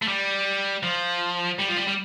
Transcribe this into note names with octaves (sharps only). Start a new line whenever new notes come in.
A3
G3
F3
G3
F3
G3
G3